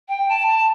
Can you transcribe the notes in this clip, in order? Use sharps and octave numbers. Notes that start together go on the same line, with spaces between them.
G5
A5
A5